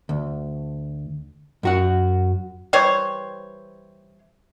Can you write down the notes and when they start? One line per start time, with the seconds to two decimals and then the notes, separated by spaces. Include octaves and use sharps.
0.09 D2
1.63 F#2 F#4 F#5
2.73 E3 G3 C5 C#5